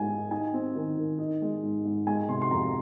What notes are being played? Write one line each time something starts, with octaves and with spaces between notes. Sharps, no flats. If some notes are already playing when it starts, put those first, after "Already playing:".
Already playing: G#2 G#3 G#5
D#4
D#4 G#5
C4
D#3
D#3
D#4
G#3
G#2
G#2
G#3 G#5
C3 C6
C6
F2 A#5